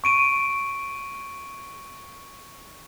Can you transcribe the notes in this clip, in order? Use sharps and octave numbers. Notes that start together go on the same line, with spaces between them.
C#6 D7 D#7